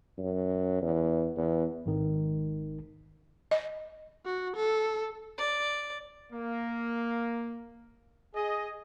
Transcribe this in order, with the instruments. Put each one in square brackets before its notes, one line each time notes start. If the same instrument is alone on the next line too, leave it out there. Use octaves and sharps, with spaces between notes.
[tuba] F#2
E2
E2
[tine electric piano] G#1 D#3
[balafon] D#5
[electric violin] F#4
A4
[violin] D5
[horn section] A#3
G#4 D#5